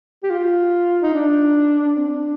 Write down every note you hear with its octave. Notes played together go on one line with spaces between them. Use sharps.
G4
F4
D#4
D4
D4
C4
D4